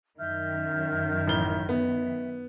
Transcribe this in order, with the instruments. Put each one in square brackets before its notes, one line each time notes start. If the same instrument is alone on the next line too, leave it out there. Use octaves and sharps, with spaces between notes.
[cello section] F#2 D#3 [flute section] E5 F6 G6
[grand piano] A1 G7
[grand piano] B3 [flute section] E5